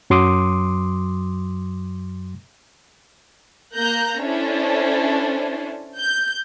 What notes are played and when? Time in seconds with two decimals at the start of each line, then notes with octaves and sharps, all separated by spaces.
0.10 F#2 F#3 C6 D6 D#6
3.75 A#3 A#5 F#6 G6
4.21 C#4 D4 E4 A4 C5
5.97 G6